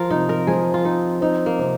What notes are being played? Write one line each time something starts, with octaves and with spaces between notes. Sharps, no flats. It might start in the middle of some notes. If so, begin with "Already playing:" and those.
Already playing: F3 F4 A#4
C3 D#4
A#4
F3 G#4
F4
C4 D#4
C4 D#4
A#3
C3